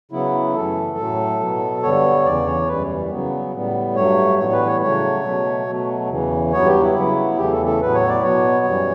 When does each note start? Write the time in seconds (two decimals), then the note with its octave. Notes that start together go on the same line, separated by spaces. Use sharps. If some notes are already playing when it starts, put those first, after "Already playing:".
0.11 C#3 F#3 B3 E4
0.54 F#2 E3 A3 A4
0.98 A2 F#3 A3
1.40 B2 F#3 B3
1.83 G2 D3 G3 B3 C#5
2.25 E2 C#3 E3 D5
2.46 C#5
2.68 F#2 E3 G3 B4
3.11 C#3 F#3 B3
3.54 A2 G3 B3
3.96 G2 F#3 A3 C#5
4.39 A2 E3 G3 B3 C#5
4.52 B4
4.67 C#5
4.82 C#3 F#3 A3 C#5
5.24 B2 F#3 A3
5.67 B2 F#3 A3
6.09 E2 C#3 E3
6.53 G2 F#3 B3 C#5
6.67 G4
6.82 E4
6.96 C#3 F#3 B3
7.37 E2 C#3 E3 A3 G4
7.52 A4
7.66 A4
7.81 A2 F#3 B3 B4
7.95 C#5
8.09 D5
8.23 B2 F#3 B3 C#5
8.65 F#2 E3 G3